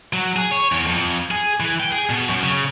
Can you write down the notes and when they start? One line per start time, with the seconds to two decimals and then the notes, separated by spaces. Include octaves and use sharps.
0.13 F#3
0.36 G#4
0.51 C#5
0.72 E2
0.87 F2
1.31 G#4
1.60 E3
1.80 G5
1.92 G#4
2.10 B2
2.30 F#2
2.43 C#3